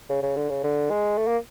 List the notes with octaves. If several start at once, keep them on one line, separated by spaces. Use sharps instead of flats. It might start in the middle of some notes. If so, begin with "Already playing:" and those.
C#3
C#3
D3
C#3
D3
G#3
A3
A#3